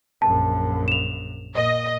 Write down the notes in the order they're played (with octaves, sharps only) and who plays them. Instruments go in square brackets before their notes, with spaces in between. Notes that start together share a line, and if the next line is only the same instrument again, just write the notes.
[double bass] A#1 F#2 [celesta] A5
[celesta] E7 F7
[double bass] A#2 [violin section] D#5